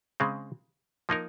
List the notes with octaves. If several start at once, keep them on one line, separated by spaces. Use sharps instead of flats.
C#3 G#3 C4
F3 A#3 D#4 A#4